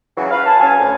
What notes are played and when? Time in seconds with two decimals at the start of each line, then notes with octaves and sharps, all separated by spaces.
0.17 C#3 E3 F#3
0.31 B4 F5
0.46 G#5 A5
0.60 F#3 C#4 F5 G#5
0.80 D2